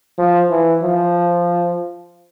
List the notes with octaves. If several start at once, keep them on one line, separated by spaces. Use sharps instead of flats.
F3
E3
F3